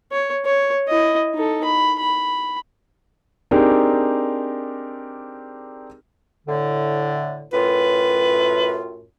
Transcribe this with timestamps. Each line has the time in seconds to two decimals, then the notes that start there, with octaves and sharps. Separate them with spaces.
0.12 C#5
0.45 C#5
0.87 E4 D#5
1.34 D#4 A4
1.64 B5
2.00 B5
3.51 C4 D4 D#4 G4 G#4 A#4
6.47 A2 D3
7.53 F#2 A2 F4 B4